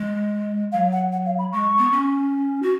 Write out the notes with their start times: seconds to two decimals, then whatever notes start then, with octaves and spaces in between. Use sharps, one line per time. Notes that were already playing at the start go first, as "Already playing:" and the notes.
Already playing: G#3
0.72 F#3 F5
0.92 F#5
1.12 F#5
1.26 F5
1.39 B5
1.52 G#3 C#6
1.78 B3
1.92 C#4
2.62 F#4